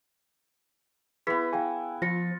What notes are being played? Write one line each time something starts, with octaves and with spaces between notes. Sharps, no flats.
B3 E4 G#4 B4 B6
G#4 F5 G5 G#5
F3 F4 A#6 C#7